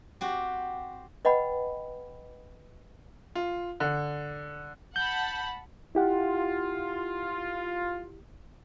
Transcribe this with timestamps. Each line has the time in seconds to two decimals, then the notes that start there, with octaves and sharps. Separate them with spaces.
0.21 C4 F#4 G4
1.25 B4 D#5 F#5 G5 B5
3.35 F4
3.80 D3
4.96 F#5 A5 B5 G6
5.95 E4 F4 G4 F#5